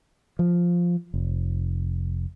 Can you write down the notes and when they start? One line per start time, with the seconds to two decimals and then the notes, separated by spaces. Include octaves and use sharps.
0.39 F3
1.14 F1